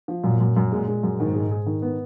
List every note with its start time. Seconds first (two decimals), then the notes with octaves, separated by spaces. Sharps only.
0.08 F3
0.24 F#2 A#2
0.40 F#2
0.57 F#2
0.71 A#2 G#3
0.88 G#3
1.03 F#2
1.19 G#2 D#3
1.35 G#3
1.51 G#4
1.66 D#3
1.82 B3